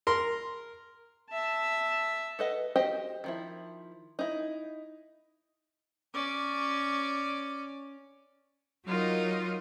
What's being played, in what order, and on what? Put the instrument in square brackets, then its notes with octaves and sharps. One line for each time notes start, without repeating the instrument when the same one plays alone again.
[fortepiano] A#4 C6
[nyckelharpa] E5 A5
[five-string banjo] A4 B4 D#5 F#5
F#4 G4 C5 D#5 G5
D#3 F3 E4
D#4 E4
[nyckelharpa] C#4 D5
[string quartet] F#3 D#4 F4 A#4 D#5